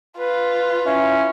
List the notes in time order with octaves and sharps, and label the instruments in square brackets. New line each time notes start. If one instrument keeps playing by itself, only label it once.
[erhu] F4 [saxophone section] B4
[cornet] C#4 [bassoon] E4